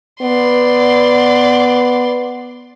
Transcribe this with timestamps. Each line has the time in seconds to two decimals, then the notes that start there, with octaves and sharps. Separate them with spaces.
0.21 B3 D5 C6